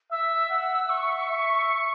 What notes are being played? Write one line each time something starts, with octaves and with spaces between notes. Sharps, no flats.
E5 E6
F#5
E5 C#6
E5